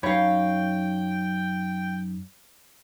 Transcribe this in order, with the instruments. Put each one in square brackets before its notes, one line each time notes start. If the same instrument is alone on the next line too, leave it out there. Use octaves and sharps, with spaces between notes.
[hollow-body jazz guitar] F#2 D#4 B5 [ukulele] C#5 F5 [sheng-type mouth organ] G5